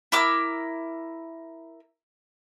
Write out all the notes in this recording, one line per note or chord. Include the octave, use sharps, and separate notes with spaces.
E4 A#4 D6 E6